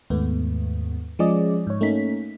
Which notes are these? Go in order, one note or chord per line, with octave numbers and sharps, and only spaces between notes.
D#2 G#2 A3 B3
F3 G#3 C#4 G#4 D5 D#5
G#2 C#5
A3 A#3 C#4 D#4 B6